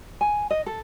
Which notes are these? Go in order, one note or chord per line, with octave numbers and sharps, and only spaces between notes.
G#5
D#5
A4